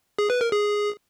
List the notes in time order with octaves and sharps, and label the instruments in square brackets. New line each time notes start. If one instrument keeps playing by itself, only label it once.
[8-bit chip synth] G#4
B4
A#4
G#4